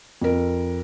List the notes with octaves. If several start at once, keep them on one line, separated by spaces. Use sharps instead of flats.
F2 A#4